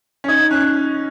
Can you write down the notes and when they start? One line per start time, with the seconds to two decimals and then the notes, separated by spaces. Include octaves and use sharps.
0.24 C#4
0.28 D#4 G#6
0.51 C#4 F#6